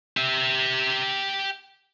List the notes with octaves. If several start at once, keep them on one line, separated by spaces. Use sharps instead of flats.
G4 E5